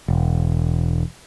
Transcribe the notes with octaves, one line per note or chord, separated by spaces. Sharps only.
E1